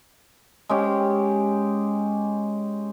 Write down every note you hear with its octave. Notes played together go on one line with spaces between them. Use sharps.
G#3 C#4 G4